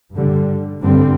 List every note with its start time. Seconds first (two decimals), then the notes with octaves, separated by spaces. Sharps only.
0.16 G2 D3 G3
0.80 G2 D3 G3 C4